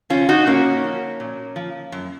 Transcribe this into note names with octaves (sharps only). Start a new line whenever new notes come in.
C#3 F3 C#4 F4
D#4 F#4
A#2 A#3 C#4
F3
A#2
F3
F#2